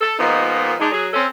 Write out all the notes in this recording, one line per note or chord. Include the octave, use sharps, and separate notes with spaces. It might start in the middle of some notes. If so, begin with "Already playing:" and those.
A4
A#2 F3 G#3 A#3 B3 D#4
G#3 D4 D#4
F#3 G#4
C4 C#4 A4